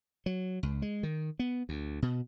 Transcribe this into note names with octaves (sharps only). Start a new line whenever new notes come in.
F#3
C#2
G#3
D#3
B3
D2
B2